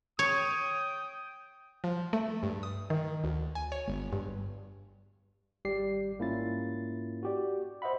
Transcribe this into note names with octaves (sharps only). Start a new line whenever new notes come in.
C#5 G5 D#6
F3
A3
G2
D#6
D#3
D2
G#5
C#5
G1
G2
G#1 G3 G4 D5 C7
G#2 A#3 C#4 E4 F4 A6
F#4 G4 D5
C5 D#5 E5 F#5 B5